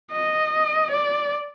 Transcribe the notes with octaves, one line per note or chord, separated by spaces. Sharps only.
D#5
D5